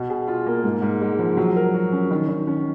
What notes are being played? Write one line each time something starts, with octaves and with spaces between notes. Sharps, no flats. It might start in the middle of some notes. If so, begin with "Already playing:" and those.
Already playing: B2
G#4
F4
A#3
G#2
G#2
G#3
F3
F#3
A#4
F#4
C#4
D#3
D#3
C#4